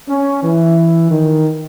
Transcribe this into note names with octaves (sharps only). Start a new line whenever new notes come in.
C#4
E3
D#3